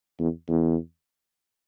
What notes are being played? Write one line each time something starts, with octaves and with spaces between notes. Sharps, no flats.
E2
E2